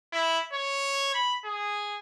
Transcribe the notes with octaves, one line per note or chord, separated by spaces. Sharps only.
E4
C#5
B5
G#4